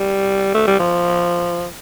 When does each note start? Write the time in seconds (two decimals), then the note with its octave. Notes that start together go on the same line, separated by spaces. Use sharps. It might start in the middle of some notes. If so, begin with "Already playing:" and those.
Already playing: G3
0.54 A3
0.67 G3
0.79 F3